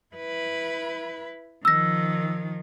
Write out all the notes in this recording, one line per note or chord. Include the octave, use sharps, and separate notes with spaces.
E4 B4
D#3 F3 E6 A#6